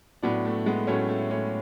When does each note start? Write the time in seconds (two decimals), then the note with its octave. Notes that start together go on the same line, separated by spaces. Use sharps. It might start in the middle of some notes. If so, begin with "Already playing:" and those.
0.22 A2 F#3 B3 D4
0.45 A3
0.66 G#3 B3
0.87 A2 F#3 A3 C#4
1.08 A3
1.31 A3 C#4